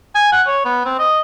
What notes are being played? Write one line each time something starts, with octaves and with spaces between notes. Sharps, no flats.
G#5
F#5
C#5
B3
C4
D#5